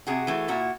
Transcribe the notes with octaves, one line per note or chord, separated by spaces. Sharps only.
C3 F#4 G#4
E3 A3
A#2 E4 F#4